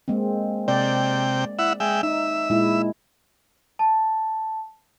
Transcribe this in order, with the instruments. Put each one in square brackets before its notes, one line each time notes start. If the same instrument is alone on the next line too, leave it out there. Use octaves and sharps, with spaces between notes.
[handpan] G#3 A#3 C4
[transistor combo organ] C3 G5 [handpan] D5
[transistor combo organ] E4 E5 F#5
G#3 E5 G5
[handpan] D#4 [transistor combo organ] E5
[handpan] A#2 G#3 E4
[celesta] A5